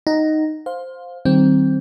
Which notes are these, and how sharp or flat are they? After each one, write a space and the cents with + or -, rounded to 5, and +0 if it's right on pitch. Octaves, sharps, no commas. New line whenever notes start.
D#4 +0 F#5 +25
C5 +0 F5 +20
D#3 +0 G3 -30 C4 +0